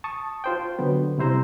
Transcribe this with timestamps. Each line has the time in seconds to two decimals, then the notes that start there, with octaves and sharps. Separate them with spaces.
0.04 A5 C#6 D#6
0.44 F4 C5 G5
0.79 D3 F#3 B3
1.18 C3 G3 E4 C5 A#5 E6